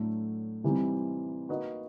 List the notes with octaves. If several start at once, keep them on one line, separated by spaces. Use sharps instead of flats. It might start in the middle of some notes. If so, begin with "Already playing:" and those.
Already playing: A2 F#3 A3 D4
C3 E3 G3 C4 D#4
A#3 D#4 F#4 B4 D#5